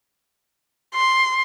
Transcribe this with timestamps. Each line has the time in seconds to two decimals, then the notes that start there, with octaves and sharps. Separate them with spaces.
0.95 C6